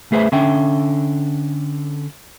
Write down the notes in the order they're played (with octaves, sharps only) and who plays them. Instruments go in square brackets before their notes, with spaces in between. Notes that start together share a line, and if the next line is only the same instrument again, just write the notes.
[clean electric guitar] A3 G#4 B4 C5 E5
D3 C#4 E5 G5